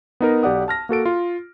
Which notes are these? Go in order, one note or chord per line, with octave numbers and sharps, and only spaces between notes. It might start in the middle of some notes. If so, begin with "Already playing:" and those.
B3 D#4 A#4
B1 G4 D5 F#5 D#6
A5 F6 A#6
A#3 F#4 A4 D7
F4